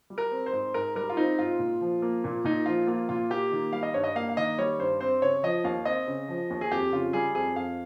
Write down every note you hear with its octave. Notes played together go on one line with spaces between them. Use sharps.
G3
A#4
C4
C5
G#2
G#2 A#4
G3 A#4
F4
C4 D#4
G#2 F4
A#2
F3
A#3
A#2
A#2 D#4
F3 F4
A#3 F4
A#2 F4
A#3 G4
D#3
G3 F5
D#5
G2 C#5
D#5
A#3 F5
F5
D#3 D#5
G3 C#5
G2 C5
C4 C5
C#3 C#5
F3 D#5
D#2 F5
C4 D#5
C#3
F3
D#2
G#4
F2 G4
C#3 F4
G3 G#4
F2 G#4
F2 F5